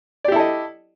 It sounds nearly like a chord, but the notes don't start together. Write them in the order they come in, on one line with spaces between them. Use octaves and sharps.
D5 G4 E4 A4 D#5